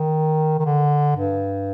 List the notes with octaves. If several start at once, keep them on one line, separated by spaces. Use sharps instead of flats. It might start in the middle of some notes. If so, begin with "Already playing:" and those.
Already playing: D#3
D#3
D3
G2